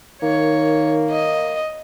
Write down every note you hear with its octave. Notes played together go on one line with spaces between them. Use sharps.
D#3 A#3 C#5
D#5